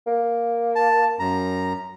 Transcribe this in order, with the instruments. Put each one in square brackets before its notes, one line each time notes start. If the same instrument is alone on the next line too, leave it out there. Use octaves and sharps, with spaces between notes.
[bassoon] A#3
[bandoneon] A5
F#2 A#5